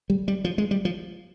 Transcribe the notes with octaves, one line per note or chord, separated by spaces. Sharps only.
G3
G3
F3
G#3
G3
F3